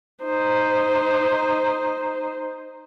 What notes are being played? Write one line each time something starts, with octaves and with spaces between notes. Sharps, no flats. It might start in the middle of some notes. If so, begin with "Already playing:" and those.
D#4 C5